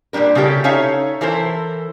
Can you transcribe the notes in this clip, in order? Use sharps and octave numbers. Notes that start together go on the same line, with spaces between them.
A#2 E3 G3 D4 A#4
C#3 C#4 E4 G4 A4
C#4 D#4 A4 C#5 E5 F5
E3 E4 A4 A#4 C5